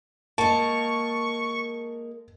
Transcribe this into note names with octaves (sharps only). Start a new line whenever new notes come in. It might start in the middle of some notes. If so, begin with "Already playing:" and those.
G#3 A#3 A5 C#6